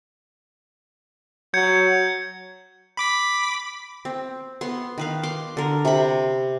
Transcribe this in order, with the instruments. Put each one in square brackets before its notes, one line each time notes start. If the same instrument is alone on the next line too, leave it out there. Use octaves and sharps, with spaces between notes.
[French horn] F#3 [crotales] G6 G#6 C#7
[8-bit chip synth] B5 D6 B6
[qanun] C4
B3 C6
D#3 B4 F5
C6 D6
D3 A#4
C3 B5